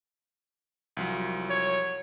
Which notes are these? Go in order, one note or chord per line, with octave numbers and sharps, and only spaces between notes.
C2 F3 F#3
C#5